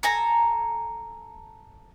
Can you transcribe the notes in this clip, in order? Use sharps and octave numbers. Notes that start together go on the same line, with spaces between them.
A4 G#5 A#5